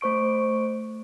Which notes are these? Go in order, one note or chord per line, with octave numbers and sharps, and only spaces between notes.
A3 C5 C#6 D7